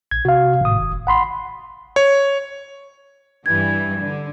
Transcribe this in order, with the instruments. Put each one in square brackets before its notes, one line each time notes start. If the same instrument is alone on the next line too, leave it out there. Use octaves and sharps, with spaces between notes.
[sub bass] A#1 [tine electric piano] G#6
[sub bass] C3 [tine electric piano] F#4 F5
[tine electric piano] G#1 D#6 [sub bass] A2
[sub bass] F1
[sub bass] G#1 [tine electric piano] F#5 B5 C6
[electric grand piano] C#5
[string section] G2 E3 [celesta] G#6
[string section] D3